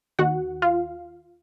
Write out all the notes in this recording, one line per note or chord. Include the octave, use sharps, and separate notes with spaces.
D#2 D#3 F#4 F#5
F4 F5